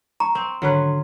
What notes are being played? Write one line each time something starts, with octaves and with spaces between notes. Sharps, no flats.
A#5 C#6
C4
G#1 D3 F#3 C#4 B4 C6